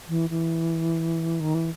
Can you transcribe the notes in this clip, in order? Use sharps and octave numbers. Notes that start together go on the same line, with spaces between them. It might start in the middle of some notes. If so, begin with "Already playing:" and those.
E3
E3
D#3
E3